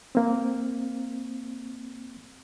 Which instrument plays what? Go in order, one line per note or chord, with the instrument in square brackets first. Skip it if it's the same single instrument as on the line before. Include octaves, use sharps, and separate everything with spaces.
[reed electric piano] A#3 C4